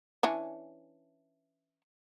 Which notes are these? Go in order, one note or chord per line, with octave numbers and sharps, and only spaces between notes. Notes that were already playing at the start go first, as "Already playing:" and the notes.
E3 C#4 D4